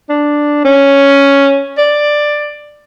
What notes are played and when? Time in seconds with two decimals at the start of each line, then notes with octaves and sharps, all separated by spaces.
0.09 D4
0.65 C#4
1.78 D5